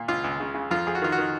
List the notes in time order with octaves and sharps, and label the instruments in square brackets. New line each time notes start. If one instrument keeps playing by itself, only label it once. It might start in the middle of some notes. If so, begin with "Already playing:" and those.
Already playing: [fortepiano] A#2
C#2 F4
C#2
C#3
C#3
F2 F4
F2 G#4
F#4
D#3 F4
F#4
D#3